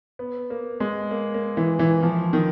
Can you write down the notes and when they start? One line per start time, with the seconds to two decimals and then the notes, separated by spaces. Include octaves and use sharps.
0.19 B3
0.50 A#3
0.80 G#3
1.11 A#3
1.34 A#3
1.57 E3
1.79 E3
2.03 F3
2.33 D#3